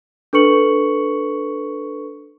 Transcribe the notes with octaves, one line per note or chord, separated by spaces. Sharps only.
D4 A4 B4 C#6 C#7 F#7